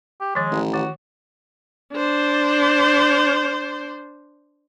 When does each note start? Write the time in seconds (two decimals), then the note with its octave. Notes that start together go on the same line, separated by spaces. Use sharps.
0.20 G4
0.35 D#3 F3 G#3
0.51 A1
0.74 D#3 F#4
1.94 D4 C5